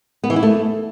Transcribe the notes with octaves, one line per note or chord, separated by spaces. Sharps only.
B3
E3
E4
A3